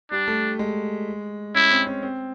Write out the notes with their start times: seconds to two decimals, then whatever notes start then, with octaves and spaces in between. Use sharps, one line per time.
0.11 G3 D4
0.28 A3
0.59 G#3
1.55 C#4 E4
1.71 C4
1.87 C#4
2.03 C4